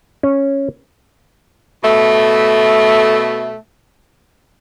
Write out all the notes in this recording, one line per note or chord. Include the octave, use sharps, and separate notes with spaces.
C#4
B2 A3